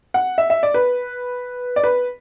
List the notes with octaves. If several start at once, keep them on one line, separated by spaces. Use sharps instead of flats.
F#5
E5
E5
D5
B4
D5
B4